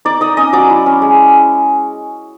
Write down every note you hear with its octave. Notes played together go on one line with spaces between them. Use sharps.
D#4 D5 D6
D#4 D#5 D#6
C#4 D#5 D#6
F#3 D5 D6
E4
C#4
G#3